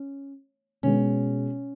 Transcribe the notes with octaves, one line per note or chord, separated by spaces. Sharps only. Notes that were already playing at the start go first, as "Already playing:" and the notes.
Already playing: C#4
B2 G#3 B3 C#4